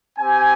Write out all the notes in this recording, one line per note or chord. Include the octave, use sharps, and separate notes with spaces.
C4 G4 G#5